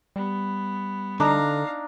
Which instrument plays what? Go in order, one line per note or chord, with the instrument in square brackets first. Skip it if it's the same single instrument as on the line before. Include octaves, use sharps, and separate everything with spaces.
[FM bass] G3 [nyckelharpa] B3
[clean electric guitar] D3 [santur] D4 D#4 [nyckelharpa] F5 A#5